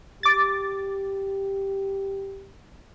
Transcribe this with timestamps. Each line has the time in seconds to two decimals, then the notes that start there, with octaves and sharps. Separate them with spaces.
0.23 G4 D6 A6